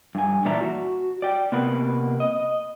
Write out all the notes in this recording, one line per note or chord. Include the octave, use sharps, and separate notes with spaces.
G2 G#5
A#2 E3 D4 D5 E5 A#5
F#4
D5 G5
C3 A#3 B3 B4
D#5